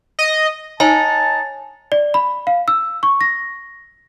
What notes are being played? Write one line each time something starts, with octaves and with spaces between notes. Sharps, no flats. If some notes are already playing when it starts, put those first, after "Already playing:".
D#5
D#4 C#5 G#5 A5
D5
B5
F5
E6
C#6
A#6